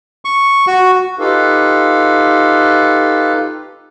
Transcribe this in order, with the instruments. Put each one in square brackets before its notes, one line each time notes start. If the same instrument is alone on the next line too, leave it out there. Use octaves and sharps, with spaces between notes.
[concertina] C#6
F#4
[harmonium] D#4 F4 G4 A4 B4 F5